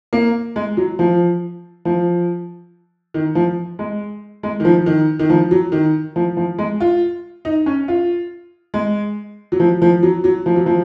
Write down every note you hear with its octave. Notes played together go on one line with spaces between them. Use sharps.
A#3
G#3
F#3
F3
F3
D#3
F3
G#3
G#3
D#3
F3
D#3
D#3
F3
F#3
D#3
F3
F3
G#3
F4
D#4
C#4
F4
G#3
F#3
F3
F3
F#3
F#3
F3
F#3
F3